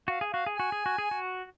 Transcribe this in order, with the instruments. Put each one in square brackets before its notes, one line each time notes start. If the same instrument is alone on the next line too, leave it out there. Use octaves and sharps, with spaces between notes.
[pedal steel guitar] F#4 [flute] F5
[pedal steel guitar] G#4
[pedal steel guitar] F#4 [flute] F5
[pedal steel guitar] G#4
[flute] G#5
[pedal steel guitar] F#4
G#4
F#4
G#4
F#4